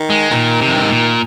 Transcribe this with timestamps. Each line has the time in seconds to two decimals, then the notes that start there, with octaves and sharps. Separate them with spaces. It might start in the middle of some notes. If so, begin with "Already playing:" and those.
Already playing: D#3
0.10 G#3
0.31 A#2 D#3
0.62 C3
0.68 F2
0.76 G2
0.83 G#2
0.90 A#2